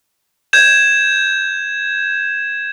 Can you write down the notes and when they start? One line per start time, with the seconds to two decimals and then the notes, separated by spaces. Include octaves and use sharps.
0.53 G6 G#6 E7